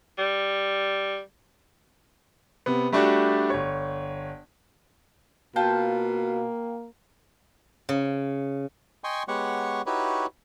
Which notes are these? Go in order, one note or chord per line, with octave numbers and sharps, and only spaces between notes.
G3
C3 B3
G3 A3 D4 F#4 G4
G1 C#5
B2 A#3 F4 G5 A5
C#3
D#5 G5 G#5 C6 C#6
G#3 B3 G4 C#5 F#5 C#6
D#4 E4 F#4 G4 B4 C#5